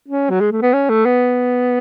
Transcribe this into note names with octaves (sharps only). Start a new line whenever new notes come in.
C#4
F#3
G#3
A3
B3
C#4
A3
B3